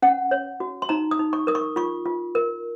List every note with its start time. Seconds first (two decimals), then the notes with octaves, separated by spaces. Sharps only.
0.02 C#4 F#5
0.31 C#5
0.60 F#4
0.82 C6
0.89 D#4 A#5
1.11 D#6
1.19 D#4
1.33 C#6
1.47 A#4 D#6
1.55 C#6
1.76 F4 C#6
2.06 F4
2.35 A#4